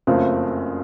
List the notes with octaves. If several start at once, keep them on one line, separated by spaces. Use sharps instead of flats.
F#1 F2 C#3 A3 C4